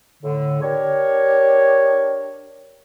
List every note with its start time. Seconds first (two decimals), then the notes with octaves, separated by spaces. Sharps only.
0.23 A2 D3
0.62 D4 G4 A#4 C#5